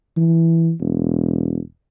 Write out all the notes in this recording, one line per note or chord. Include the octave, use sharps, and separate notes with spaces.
E3
E1